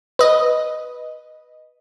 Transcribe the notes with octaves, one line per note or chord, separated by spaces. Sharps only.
B4 D#5